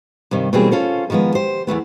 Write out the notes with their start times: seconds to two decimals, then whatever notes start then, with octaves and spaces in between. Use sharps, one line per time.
0.31 G2 C3 D#3
0.53 B2 E3 G3 A#3 C4 G#4
0.71 C#4 F4 A4 C5
1.10 D3 D#3 F3 G#3 B3
1.35 G4 C5
1.67 E2 G2 A3 B3